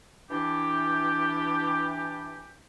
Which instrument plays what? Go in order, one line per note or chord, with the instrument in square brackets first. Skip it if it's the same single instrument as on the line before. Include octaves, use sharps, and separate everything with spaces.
[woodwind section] E3 D4 G4